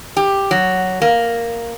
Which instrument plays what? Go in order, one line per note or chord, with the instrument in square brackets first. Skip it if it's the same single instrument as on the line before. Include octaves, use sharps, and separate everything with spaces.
[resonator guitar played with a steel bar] G4
F#3
A#3